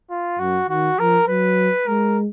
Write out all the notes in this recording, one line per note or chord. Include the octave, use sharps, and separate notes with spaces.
F4
F#2 F#4
D#3 F#4
F3 A#4
F#3 B4
G#3 A#4